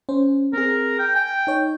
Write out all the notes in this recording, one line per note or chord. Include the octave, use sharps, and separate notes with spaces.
C#4 C5
C4 G#4 A#4
G5
G5 G#5
D#4 C#5